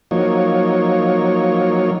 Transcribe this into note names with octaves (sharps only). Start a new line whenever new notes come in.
F3 F#3 A#3 D#4 C#5